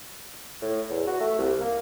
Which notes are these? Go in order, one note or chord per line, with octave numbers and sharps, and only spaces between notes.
A2
E2
F#4
A3
C2
A#3